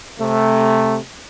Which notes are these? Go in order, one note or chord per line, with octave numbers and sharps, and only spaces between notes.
C3 A3